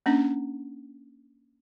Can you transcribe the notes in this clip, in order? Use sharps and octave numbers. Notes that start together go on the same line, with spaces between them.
A#3 C#4 D4